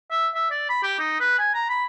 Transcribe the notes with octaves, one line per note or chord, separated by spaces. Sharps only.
E5
E5
D5
B5
G4
D#4
B4
G#5
A#5
B5